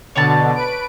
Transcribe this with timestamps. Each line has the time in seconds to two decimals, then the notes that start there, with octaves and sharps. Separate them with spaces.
0.15 B2 D3 C#5 D5 A5
0.55 B4 D7